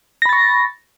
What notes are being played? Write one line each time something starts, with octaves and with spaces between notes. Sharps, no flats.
B5 C#6 A6 A#6